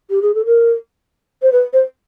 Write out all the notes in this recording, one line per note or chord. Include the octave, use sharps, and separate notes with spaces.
G4
G#4
A4
A#4
C5
B4
C5